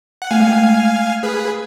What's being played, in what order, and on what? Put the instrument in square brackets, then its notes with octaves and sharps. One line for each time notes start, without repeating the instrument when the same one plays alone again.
[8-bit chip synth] F#5
[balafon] A3 [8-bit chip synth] F5 G#5
[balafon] G#3
A3
[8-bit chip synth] G#4 B4